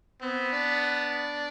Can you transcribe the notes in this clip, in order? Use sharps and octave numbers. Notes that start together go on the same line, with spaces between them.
B3 C4
D4